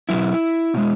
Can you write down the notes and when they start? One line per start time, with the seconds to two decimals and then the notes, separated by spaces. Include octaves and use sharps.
0.09 B2 F#3 E4
0.74 B2 G#3